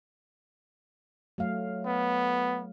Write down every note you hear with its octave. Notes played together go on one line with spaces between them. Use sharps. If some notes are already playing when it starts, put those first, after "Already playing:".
F#3 A3 F5
B3